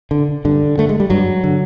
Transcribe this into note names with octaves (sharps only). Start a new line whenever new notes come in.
D3
G2 D3
D3 A3
G#3
G3
G2 F#3
D3